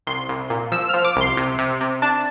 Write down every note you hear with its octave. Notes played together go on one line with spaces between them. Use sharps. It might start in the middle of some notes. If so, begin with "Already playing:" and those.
C2 C6
C2
A#2
F3 E6
F6
F3
D6
C2
C6
C3
C3
C3
D4 A5